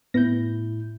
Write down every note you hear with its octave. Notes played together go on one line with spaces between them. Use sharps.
A2 B3 E4 G6 A#6